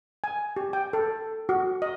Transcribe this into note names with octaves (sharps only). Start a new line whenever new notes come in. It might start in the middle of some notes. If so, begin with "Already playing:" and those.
G#5
G4
G5
A4
F#4
D#5